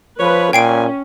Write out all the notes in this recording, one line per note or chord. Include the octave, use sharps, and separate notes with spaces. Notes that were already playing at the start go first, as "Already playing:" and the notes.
F3 B4 C#5
A#2 C#4 G5 G#5 C7 D7